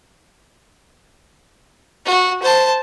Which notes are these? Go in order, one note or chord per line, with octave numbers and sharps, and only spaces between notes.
F#4
C5 A5